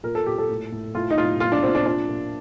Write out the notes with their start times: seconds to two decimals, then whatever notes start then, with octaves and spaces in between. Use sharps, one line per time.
0.03 A#2 A#4
0.15 A4
0.26 A#2 G4
0.38 A4
0.50 A2
0.72 A2
0.95 A2 F4
1.10 D#4
1.18 A2 F4
1.40 A#2 F4
1.52 D4
1.63 A#2 C4
1.75 D4
1.86 A#2 D4
2.09 A#2